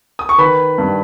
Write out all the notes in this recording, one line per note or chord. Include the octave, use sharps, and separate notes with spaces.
D#6
C#6
D#3 B4 B5
G2